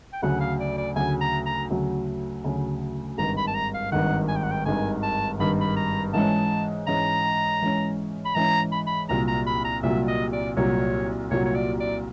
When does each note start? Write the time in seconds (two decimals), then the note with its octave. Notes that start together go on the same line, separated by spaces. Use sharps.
0.13 G5
0.22 D2 C#3 F#3 F#5
0.41 F5
0.60 D5
0.78 D5
0.96 D2 C#3 F#3 G#5
1.21 A#5
1.46 A#5
1.70 D2 C#3 F#3
2.44 D2 C#3 F#3
3.18 G#1 G2 D#3 A#5
3.37 B5
3.47 A5
3.55 A#5
3.74 F5
3.92 G#1 G2 D#3 F#5
4.28 G#5
4.36 G5
4.43 F#5
4.51 G5
4.65 G#1 G2 D#3 G#5
5.03 A5
5.40 G#1 G2 D#3 B5
5.61 B5
5.77 A#5
6.13 G#2 E3 G#3 C#4 A5
6.87 G#2 E3 G#3 C#4 A#5
7.61 G#2 E3 G#3 C#4
8.25 B5
8.35 G#2 E3 G#3 C#4 A#5
8.72 B5
8.87 B5
9.09 C2 A#2 F#3 A#5
9.28 A#5
9.47 B5
9.65 A#5
9.83 C2 A#2 F#3 E5
10.08 D#5
10.33 D5
10.57 C2 A#2 F#3 C#5
11.31 C2 A#2 F#3 C#5
11.45 C#5
11.55 D5
11.80 D5